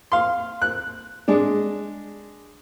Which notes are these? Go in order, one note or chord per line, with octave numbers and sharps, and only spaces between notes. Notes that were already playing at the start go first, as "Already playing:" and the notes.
F5 C6
F#6
G#3 D4